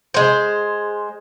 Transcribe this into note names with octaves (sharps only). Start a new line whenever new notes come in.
G#3 C5